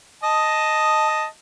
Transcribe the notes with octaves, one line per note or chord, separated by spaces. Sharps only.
D#5 A5